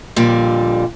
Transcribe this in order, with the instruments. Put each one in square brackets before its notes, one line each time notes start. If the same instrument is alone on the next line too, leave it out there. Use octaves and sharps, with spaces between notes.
[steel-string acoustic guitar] F2 A#2 D3 G3